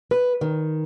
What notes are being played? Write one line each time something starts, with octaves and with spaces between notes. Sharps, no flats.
B4
D#3